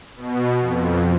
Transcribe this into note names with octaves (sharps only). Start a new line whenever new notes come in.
B2
F2